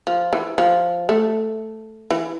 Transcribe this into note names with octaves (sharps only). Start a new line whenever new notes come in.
F3
E3
F3
A3
E3